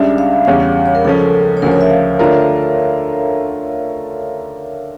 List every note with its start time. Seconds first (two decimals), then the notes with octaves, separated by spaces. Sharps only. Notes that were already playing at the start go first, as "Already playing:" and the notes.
Already playing: C#2 C#3 G3 D4 E5
0.18 F5
0.45 E2 C#3 G3 C#4 F5
0.86 C#5
0.95 A#4
1.04 C#2 C#3 F3 C#4 A4
1.57 C#5
1.62 D2 C#3 F3 A#4
1.71 C#5
1.81 E5
1.90 F5
2.19 D3 A3 D4 F4 A#4